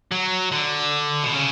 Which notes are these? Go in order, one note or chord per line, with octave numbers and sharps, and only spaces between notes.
F#3
D3
B2
C#3